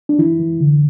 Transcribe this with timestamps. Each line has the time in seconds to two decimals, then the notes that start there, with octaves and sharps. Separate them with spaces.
0.09 D4
0.19 E3 E4
0.39 E3
0.61 D3